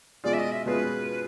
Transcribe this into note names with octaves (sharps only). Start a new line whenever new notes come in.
B2 G#3 C#4 F4 G#4 D5
E5
D#5
E5
B2 G#3 C#4 F4 G#4 B4